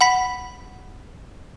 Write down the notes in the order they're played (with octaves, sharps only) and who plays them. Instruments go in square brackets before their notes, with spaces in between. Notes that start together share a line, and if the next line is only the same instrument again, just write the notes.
[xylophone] F#5 B5 B6